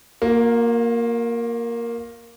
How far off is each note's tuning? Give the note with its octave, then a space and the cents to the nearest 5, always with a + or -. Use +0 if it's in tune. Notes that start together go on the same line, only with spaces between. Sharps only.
A#3 +0 F4 +45